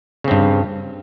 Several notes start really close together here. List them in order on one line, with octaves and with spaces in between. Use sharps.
C#3 C4 G2